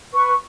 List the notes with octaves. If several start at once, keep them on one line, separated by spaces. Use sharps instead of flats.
B4 C#6